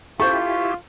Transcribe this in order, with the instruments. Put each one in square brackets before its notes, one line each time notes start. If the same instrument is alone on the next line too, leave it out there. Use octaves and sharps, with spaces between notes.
[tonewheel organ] E4 G4 [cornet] F4 [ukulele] A4 C5 [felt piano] C#6